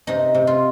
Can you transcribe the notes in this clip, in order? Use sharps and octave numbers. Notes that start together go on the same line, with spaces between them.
C3 D#4
C3
F4